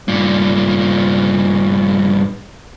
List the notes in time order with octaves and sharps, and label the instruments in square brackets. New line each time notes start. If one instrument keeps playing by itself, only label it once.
[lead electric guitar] G2 A#2